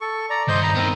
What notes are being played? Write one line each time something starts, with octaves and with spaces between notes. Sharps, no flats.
A4 C#6
D5 A#5
G2 D#3 C5 D#5 G6
A#5 B5
D#3 B3 C4 A#4